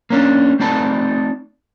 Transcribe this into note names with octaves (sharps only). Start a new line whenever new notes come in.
A#3 C#4 D4
A3 C4 D#4 D5 A5 B5